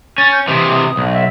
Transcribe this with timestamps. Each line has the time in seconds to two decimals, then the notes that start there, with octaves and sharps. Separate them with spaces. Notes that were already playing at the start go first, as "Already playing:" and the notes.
0.18 C#4 A6
0.32 G6
0.48 C3 E3 D#6
0.97 B1
1.13 E5